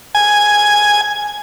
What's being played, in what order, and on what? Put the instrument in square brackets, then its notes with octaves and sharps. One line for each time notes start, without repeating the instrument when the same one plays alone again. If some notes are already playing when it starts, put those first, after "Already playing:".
[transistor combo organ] G#5